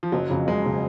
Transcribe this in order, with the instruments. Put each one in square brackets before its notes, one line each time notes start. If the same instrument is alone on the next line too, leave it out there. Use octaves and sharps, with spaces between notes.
[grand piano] F3
[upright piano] F#1 [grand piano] F#3
[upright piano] F2 C#3
[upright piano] F#1 [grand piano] G#3
[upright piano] C#3